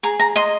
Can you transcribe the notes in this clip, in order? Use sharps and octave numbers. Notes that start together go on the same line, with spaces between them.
G#4 A#5
A#5
D#5 C6